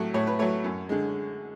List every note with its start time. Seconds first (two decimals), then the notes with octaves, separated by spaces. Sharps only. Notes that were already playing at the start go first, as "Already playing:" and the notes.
Already playing: A2 F#3 A3
0.14 A2 C#5
0.27 B4
0.39 F#3 A3 C#5
0.64 F#2
0.89 D3 G#3